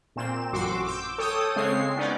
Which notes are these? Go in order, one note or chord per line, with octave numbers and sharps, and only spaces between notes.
A#2 C4 E7
A1 F#2 F#4 C6 D6 E6
D6 E6 G6
A4 C#5 G5 D#6 E6
C#3 G#3 C4 C#5 C7
B3 C#4 D#4 D5